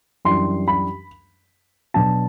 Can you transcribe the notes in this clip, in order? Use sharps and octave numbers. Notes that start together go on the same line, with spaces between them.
F#2 E3 G3 D4 C6
B5
B2 F#3 B3 D4 A5